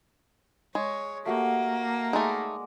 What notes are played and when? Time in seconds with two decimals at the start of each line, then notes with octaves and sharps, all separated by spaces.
0.75 G#3 C#5
1.26 A3 A#3 F#4 G4
2.13 G#3 A3 D#4 D5